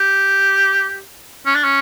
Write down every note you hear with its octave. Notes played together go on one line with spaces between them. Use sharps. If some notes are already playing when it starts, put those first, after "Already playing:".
Already playing: G4
C#4
D4
C#4